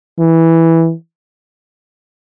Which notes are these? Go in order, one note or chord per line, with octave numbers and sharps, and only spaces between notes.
E3